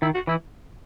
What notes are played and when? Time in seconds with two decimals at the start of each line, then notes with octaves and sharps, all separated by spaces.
0.02 D#3 E4
0.14 F#4
0.27 E3 E4